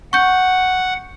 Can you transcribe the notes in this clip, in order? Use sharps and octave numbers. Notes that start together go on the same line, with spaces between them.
F#5 C#6 G6